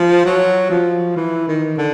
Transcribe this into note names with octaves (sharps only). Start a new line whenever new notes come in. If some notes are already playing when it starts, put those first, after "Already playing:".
Already playing: F3
F#3
F3
E3
D#3
D3